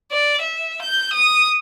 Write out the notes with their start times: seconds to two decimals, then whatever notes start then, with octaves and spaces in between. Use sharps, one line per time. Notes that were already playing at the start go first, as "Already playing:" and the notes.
0.12 D5
0.42 E5
0.82 G6
1.13 D#6